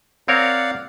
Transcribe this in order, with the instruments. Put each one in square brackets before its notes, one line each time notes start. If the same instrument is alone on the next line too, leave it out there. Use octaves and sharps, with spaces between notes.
[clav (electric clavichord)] C4 A#4 C#5 [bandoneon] D5 F5 F#5